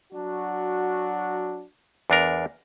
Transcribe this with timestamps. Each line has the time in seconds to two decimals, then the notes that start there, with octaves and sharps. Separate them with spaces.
0.13 F#3 D4 F#4
2.10 E2 D4 A#4